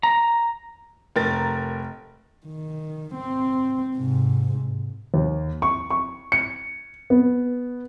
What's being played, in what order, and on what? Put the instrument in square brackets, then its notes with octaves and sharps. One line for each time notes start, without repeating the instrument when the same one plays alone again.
[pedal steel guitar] A#5
[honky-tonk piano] F1 A#4 A6
[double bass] D#3
C4
G#2 C3
[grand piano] D#2
C#6
C#6
C#7
B3